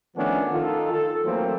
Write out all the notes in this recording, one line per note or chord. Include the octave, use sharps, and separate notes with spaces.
D#3 F3 A3 B3 C#4 D4
D#3 F4 A4
A4
E3 F#3 A3 A#3 C4